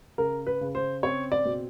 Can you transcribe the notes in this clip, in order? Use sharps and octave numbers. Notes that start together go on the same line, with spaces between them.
C#3 A#4
B4
C#3
C5
C4 C#5
D5
B2